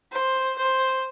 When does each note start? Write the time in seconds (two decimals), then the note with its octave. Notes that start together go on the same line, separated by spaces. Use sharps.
0.12 C5
0.58 C5